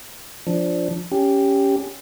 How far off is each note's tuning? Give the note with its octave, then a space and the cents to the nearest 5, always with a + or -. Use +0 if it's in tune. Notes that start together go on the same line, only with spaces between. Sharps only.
F3 +0 D4 -10
C#4 +10 G4 +0